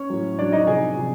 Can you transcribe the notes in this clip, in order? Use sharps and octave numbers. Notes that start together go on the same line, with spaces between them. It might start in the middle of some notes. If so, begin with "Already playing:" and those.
Already playing: C#4 C#5
A2 F#3
A2 F#3 D4 D5
D#4 D#5
C3 F3 G#4 G#5
C3 F3